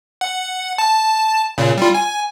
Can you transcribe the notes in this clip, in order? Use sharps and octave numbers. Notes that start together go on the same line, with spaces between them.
F#5
A5
A#2 C#3
G3 F4
G#5